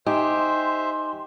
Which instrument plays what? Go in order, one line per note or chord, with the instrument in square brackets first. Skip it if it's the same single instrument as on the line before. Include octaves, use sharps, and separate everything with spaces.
[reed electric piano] D#4 D#5 G#5 [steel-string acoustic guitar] G4 [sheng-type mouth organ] C5 E5 [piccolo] C6